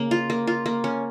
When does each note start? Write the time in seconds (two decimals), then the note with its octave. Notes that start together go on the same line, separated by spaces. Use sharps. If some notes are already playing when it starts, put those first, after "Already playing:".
Already playing: C#3 A#3 A#4
0.11 F4
0.30 A#3
0.47 F4
0.66 A#3
0.84 C#4